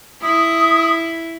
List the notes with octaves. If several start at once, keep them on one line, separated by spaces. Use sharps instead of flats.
E4 D#6